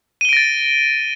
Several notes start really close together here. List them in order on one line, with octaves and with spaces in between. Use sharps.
D#7 G7 D7 A#6 A6